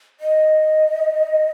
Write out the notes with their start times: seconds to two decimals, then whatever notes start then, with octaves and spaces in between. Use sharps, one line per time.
0.20 D#5